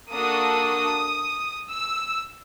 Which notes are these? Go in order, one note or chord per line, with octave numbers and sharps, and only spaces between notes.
A#3 D4 F#4 A4 D#6
E6